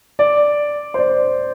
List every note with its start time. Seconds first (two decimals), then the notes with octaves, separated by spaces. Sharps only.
0.19 D5
0.94 C5
0.99 D5